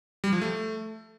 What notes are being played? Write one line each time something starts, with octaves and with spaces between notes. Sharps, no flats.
G3
F3
A3